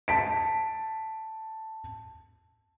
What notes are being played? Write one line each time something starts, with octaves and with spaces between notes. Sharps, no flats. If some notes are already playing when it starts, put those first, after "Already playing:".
A5 B6 D7